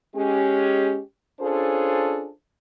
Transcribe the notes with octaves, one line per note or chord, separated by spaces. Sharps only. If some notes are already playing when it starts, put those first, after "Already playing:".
G#3 C#4 G4
C#4 D4 F4 G#4 A4 C5